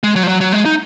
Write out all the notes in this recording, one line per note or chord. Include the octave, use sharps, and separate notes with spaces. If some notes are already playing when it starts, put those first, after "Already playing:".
G#3
F#3
F3
F#3
F#3
G#3
D#4